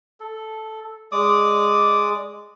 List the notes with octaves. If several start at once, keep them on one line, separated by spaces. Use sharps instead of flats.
A4
G#3 D5 D6 D#6